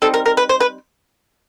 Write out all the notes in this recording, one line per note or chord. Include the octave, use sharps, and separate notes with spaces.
G3 C4 D#4 A4
A#4
A#4
B4
C5
B4